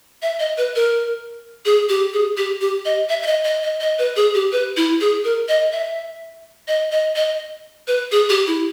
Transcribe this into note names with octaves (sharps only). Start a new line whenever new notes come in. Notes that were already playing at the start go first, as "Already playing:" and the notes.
E5
D#5
B4
A#4
G#4
G4
G#4
G4
G4
D#5
E5
E5
D#5
D#5
D#5
D#5
B4
G#4
G4
B4
E4
G#4
A#4
D#5
E5
D#5
D#5
D#5
B4
G#4
G4
E4